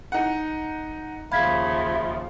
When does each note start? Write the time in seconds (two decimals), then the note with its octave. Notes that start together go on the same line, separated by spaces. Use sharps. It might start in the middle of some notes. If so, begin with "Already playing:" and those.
0.12 D#4 F#5
1.32 D#2 C#3 F3 E5 F5 B5 G#6 B6